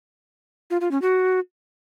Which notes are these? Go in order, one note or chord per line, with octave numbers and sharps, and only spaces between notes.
F4
F4
C#4
F#4